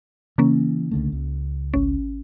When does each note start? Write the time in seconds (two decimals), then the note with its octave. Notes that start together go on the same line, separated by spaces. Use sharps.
0.38 C#3 E3 A#3 C#4
0.91 C#2 D3 A3
1.12 C#2
1.74 G#1 C#4